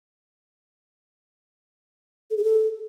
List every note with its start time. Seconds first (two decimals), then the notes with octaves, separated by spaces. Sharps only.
2.31 A4
2.37 G#4
2.44 A4